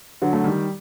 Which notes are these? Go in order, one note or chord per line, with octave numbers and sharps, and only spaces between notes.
D3 F#3
A3
D#3 G3